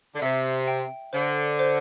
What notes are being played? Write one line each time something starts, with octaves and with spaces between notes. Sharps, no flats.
D3
C3 E5
G5
D3 C5
C5